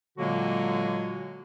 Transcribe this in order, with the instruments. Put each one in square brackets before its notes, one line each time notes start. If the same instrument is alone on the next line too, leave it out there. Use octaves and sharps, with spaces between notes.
[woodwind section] A#2 D3 F#3 G#3 A#3 F#4